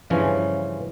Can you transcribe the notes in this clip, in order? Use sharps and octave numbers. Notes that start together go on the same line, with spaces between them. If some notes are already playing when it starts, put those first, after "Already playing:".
G2 C#3 E3 F3 C#4